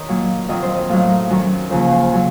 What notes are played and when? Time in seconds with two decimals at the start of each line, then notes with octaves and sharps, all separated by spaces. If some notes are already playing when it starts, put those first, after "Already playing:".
Already playing: D#3 A#4 C#5 D#5
0.09 A#2 F#3
0.49 F2 D#3 F#3 D#5
0.62 C5
0.76 D#5
0.89 A2 F#3 F5
1.09 A#4
1.30 F#2 D#3 F#3
1.70 D#2 C#3 F3 C5
1.91 C5
2.12 C#3 F#3